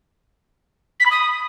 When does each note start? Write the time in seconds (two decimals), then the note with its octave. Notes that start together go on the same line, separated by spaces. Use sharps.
1.00 B6
1.05 B5
1.11 D#6